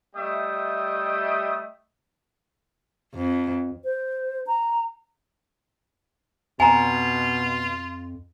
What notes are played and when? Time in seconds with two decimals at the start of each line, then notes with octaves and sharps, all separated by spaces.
0.16 G3 A3 D#5 E5 G5 D#6
3.14 F2
3.84 C5
4.47 A#5
6.60 F2 B2 F4 G#5 A#5